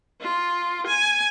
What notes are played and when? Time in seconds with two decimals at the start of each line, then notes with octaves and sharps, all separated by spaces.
0.21 F4
0.87 G#5